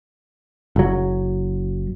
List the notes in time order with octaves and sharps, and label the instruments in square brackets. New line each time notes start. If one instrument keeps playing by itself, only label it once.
[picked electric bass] F#1 F#3